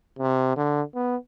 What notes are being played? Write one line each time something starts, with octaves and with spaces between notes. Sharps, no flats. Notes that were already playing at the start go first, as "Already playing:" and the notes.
C3
D3
B3